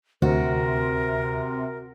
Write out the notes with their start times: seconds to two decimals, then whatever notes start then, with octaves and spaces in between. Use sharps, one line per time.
0.22 D2 C3 F#4 A#4